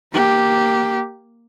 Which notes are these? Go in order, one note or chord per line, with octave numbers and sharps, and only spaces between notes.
A#3 G4